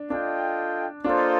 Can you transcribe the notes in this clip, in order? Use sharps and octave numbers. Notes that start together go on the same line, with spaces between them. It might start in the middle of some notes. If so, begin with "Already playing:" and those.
Already playing: D4
D4 F4 A4 D#5 G5
A#3 D4 F4 A4 C5 D#5